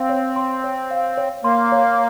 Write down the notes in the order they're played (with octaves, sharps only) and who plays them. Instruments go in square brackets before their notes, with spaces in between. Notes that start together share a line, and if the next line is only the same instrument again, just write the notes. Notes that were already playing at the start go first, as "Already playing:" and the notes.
Already playing: [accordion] C4 [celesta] F5
[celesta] C#5
C6
C#5
F5
C#5
[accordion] A#3 [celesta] C6
[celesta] C#5